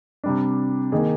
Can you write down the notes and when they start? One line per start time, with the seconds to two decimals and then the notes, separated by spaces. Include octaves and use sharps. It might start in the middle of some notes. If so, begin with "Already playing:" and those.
0.24 C3 G3 D4
0.92 D#3 A#3 D#4 G#4